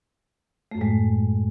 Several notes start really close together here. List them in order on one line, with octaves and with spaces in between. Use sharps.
A3 F#2 A2 G#3